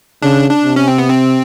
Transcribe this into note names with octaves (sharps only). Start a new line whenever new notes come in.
C#3 D4
D4
C3
C#4
C4
B3
C4